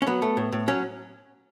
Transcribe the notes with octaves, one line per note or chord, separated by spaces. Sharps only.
C#4
F#3 B3
A3
A2
A2
F#3 C#4